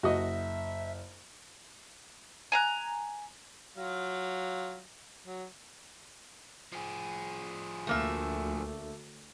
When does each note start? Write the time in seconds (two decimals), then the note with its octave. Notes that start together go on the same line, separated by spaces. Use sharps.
0.03 F#1 F#4 D#5 E5
2.52 G#5 A#5 F#6
3.77 F#3 F4 F5
5.26 F#3
6.72 F3 G#4
7.87 D2 A3 A#3 E5